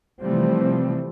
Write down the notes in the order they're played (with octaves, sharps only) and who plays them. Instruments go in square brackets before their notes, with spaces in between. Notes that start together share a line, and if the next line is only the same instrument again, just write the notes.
[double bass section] C3 E3 F3 G3 A3 C4